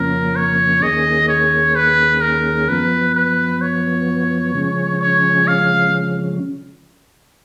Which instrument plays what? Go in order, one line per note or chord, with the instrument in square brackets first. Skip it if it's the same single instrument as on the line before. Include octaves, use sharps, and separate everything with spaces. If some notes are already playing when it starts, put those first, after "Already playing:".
Already playing: [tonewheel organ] F2 C#3 F3 A#3 C#4 [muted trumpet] A#4
[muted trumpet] C#5
[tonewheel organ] D#2 D#3 A#3 C#4 G#4 [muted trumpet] D#5
[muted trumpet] C#5
B4
A#4
[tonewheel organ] F#2 F3 B3 [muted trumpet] B4
[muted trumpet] B4
C#5
[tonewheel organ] C#3 F3 G#3 C#4
[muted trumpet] C#5
F5